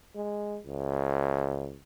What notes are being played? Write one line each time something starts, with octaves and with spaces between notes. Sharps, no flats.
G#3
C#2